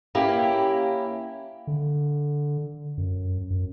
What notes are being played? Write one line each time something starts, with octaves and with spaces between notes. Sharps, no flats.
A#3 C#4 E4 G4
D3
F#2
F#2